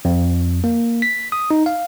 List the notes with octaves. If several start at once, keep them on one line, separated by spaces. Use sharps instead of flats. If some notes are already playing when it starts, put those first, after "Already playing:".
F2
A#3
B6
D#6
D#4
F5